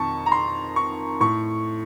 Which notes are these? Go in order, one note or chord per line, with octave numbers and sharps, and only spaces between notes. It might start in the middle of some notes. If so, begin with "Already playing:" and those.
Already playing: F2 D#3 A5 C#6
A#5
C6
C#6
A2 C#6